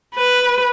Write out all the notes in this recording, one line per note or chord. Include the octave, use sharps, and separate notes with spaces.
B4